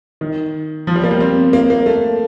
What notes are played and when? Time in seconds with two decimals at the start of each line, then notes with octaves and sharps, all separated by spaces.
0.21 D#3
0.87 F3
0.96 G3
1.04 A#3
1.11 G3
1.20 C4
1.53 A#3
1.70 A#3
1.86 A3